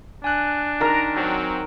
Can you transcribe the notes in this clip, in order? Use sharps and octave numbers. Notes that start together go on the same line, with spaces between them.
D4 G#5 F#6
D#3 A#4 A#5
F#3 C4